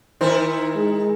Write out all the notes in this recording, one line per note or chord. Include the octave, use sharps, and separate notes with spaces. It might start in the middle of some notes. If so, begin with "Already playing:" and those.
D#3 D#4 E4 A#4 C5
G#3